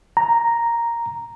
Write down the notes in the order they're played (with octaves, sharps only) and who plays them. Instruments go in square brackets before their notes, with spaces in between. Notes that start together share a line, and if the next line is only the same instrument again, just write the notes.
[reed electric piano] A#5